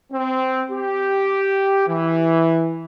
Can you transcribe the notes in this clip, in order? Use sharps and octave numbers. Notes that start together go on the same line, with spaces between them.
C4
G4
E3